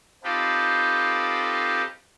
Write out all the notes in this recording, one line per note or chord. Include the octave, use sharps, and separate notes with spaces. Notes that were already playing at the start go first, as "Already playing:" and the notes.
C4 D#4 F4 G4 A4 B4